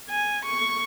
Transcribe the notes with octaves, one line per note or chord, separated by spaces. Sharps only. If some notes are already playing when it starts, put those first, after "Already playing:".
G#5
C#6